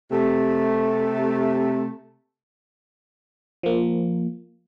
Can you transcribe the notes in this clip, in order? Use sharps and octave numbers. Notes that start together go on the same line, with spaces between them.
C3 A3
F3 A#3